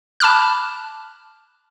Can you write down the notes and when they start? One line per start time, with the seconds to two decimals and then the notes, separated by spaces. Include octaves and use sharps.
0.20 A5 B5 D6 F6 F#6